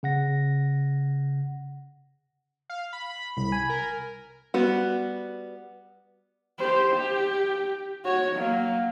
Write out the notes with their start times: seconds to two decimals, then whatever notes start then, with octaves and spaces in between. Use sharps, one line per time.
0.03 C#3 F#5 A#6
2.70 F5
2.93 B5
3.37 C2 B5
3.52 G#5
3.70 A#4
4.54 G3 B3 F#4
6.58 G4 C5
6.92 G4
8.05 F#4 C#5
8.35 F#3 A#3